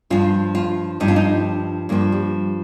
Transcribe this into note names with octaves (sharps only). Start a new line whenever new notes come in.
G2 F3 F4
F4
G2 F3 D#4
F4
D#4
G2 F3 A#3
G3